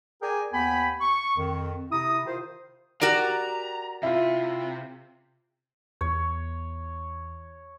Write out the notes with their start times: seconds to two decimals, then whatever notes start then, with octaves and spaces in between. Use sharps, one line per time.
0.22 G#4 A#4 D5 G5 G#5
0.54 D#2 B3 G5 G#5 B5
1.01 C#6
1.37 F2 D#3
1.91 C3 E4 A#5 D#6
2.26 D#3 F4 C5
3.01 F#4 G4 A#4 D5 A#5
4.03 C3 E4 F4
6.01 E2 C#5